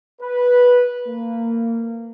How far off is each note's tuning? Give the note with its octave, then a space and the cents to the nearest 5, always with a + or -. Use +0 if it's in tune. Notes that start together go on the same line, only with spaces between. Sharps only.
B4 -10
A#3 -20